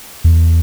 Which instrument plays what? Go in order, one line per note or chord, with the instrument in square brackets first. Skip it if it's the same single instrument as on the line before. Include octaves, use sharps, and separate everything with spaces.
[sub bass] E2